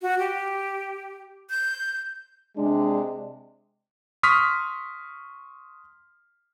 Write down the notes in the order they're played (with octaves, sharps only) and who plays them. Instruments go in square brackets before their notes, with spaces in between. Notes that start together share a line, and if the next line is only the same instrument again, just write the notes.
[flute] F#4
G4
G6
[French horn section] C3 G#3 D4
[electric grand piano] C6 C#6 D#6 F6 B6